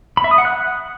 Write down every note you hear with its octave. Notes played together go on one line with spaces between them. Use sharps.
B5
E5
D#6
F#5
F#6